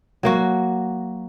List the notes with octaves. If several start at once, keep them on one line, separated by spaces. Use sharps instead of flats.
F#3 A#3 F#4